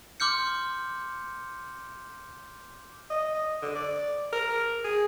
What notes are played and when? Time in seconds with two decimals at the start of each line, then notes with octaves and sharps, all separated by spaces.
0.20 C6 D6 F6 G6 C#7
3.10 D#5
3.62 D3
3.75 D5
4.33 A#4
4.84 G#4